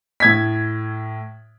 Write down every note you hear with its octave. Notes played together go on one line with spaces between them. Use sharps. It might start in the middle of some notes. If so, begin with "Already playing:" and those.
A2 G#6 B6